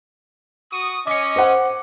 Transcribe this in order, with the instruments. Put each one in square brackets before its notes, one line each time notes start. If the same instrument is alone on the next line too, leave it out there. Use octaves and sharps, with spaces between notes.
[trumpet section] F#4 C#6 D#6
[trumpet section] C#4 D#5 [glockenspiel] D6 C#7
[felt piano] C5 F#5